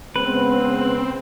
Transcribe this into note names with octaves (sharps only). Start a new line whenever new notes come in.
C#3 G#3 B3 C4 B4